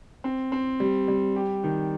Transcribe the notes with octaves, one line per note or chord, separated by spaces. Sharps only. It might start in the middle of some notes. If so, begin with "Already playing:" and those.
C4
C4
G3
G3
G4
D#3